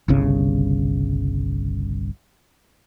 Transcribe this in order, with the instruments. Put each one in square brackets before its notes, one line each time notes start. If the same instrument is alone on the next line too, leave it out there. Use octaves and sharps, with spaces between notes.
[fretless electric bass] G1 C2 C#3